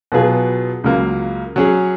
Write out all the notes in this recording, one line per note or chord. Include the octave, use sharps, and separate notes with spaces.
B2 F#3 B3 F4 G#4
C#2 C#3 F#3 A#3 F4
F#3 C#4 G#4